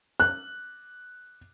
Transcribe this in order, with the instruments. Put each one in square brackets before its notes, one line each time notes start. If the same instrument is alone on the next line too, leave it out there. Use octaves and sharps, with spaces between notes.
[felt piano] F#6